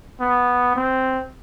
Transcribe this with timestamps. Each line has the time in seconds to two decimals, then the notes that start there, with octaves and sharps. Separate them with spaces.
0.20 B3
0.76 C4